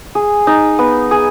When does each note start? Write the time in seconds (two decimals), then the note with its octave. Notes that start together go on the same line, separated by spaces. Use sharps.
0.15 G#4
0.47 D#4
0.79 B3
1.11 G#4